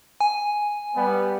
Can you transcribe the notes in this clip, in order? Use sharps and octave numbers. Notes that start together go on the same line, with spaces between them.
G#5
G3 B3